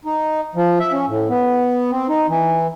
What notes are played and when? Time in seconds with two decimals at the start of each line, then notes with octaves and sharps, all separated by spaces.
0.05 D#4
0.55 F3
0.80 E5
0.93 C#4
1.07 A2
1.29 B3
1.91 C4
2.09 D#4
2.29 E3